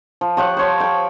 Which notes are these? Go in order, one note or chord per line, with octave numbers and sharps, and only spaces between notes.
F3
F3 G4 C#5 F#5
C5 C#5 G5
G5 B5